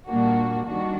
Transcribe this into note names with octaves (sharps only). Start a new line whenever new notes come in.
A#2 G3 A#3 D4 F#4
D#3 G3 D4 F#4